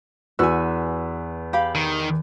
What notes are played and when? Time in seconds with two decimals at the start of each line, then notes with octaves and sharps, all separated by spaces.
0.39 E2 F#4 B4 G#5 E6
1.53 G4 F5 B5
1.75 D#3